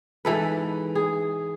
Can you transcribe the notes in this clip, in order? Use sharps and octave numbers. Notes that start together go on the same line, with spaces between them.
G#2 E3 A4 B4
G#4